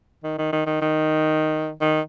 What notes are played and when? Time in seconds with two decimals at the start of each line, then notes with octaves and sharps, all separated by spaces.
0.24 D#3
0.38 D#3
0.53 D#3
0.66 D#3
0.82 D#3
1.81 D#3